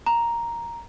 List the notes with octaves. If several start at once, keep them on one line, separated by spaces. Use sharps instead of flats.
A#5